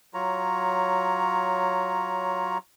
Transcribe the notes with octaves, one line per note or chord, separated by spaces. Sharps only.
F#3 F4 C#5 A#5